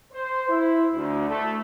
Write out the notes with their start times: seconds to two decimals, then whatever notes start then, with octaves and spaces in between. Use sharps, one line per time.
0.13 C5
0.49 E4
0.94 D2
1.28 A3